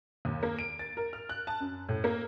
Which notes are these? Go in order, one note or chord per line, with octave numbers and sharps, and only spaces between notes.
D#2
A#3
D7
A6
A#4
F6
F#6
A5
F#2
A2
A#3